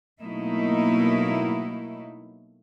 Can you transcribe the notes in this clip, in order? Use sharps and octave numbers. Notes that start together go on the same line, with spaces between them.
B2 F#3 A3 A#3 D#4 E4